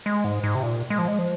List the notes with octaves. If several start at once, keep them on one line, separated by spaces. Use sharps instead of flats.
G#3
G#2
G#2
C3
A#2
G#3
F3
G#3
F3